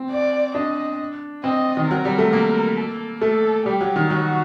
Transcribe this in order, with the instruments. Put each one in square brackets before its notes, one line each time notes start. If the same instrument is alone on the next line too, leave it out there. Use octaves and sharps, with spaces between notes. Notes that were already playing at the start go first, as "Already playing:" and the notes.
Already playing: [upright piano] C4
[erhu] D5
[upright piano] D4 [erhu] D#5
[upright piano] C4 [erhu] D#5
[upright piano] D#3
[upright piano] F#3 [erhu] A#4
[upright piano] G3
A3
A#3
[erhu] A4
[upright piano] A3 [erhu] A4
[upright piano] G3 [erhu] G4
[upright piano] F#3
D#3
[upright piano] F#3 [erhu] F#4